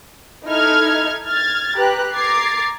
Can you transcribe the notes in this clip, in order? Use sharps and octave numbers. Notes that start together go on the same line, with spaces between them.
D#4 E4 A4 F6 G#6
F6 G#6 A6
G4 B4 A#5 F#6
A#5 D6 G#6 A6 C7